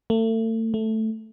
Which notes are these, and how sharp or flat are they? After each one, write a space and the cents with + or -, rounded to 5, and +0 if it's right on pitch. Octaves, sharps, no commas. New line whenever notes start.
A3 +35
A3 +0